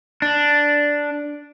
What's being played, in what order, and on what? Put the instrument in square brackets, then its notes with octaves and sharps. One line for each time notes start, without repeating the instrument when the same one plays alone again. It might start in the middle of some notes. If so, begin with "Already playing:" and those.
[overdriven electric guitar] D4